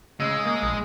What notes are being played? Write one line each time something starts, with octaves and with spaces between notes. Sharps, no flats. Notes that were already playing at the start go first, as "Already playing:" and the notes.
C#3 G#3 E6
A#3 D#6
A#1